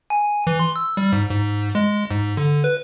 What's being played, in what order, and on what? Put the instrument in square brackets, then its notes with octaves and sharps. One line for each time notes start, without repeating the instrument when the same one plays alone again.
[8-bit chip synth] G#5
E3
C6
E6
G3
G#2
G#2
G#3
G#2
D3
B4